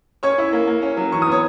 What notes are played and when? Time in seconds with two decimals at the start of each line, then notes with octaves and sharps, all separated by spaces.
0.23 C#4 C#5 C#6
0.38 E4
0.52 A#3
0.67 A#3
0.82 C#4
0.97 F#3
1.12 E3 C#6
1.22 B3 D#6
1.31 C#5 C#6